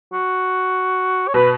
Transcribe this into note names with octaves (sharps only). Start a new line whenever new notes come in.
F#4
C#5
B2 B4